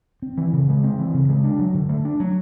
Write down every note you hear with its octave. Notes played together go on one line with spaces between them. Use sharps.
C4
E3
C#3
G#3
C4
E3
C#3
G#3
D4
F#3
D3
A3
D4
F#3